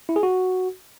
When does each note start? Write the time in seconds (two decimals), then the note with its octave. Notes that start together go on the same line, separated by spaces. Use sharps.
0.09 E4
0.16 G#4
0.23 F#4